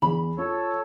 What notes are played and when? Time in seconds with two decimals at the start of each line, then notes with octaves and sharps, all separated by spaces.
0.02 E2 B5
0.38 F4 A4 C#5